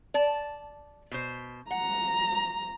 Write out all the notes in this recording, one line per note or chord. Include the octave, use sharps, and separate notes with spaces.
D5 A5
B2 C5
F#5 A#5